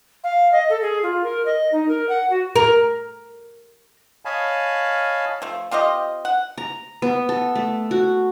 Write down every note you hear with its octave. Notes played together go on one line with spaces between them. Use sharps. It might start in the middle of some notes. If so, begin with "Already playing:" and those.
F5
D#5
A4
G#4
F4
A#4
D#5
D#4
A#4
F#5
F#4
A#4
C#5 D#5 F5 G#5 A5 B5
F3 A3
C4 F4 G4 D#5
F#5
A#5
B3
A4
A3
F#4